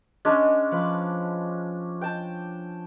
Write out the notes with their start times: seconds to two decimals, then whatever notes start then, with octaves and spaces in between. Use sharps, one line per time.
0.25 G#3 C#4 D4
0.71 F3 B4
2.01 G5 A5